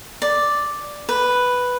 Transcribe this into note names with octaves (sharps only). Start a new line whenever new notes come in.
D5
B4